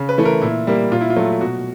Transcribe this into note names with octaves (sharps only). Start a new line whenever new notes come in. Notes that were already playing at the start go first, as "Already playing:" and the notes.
Already playing: C#3
B4
E3 A3
A#4
A#2 E4
G3 A#3
A#2 F4
E4
F4
F#3 A3
B2 F#4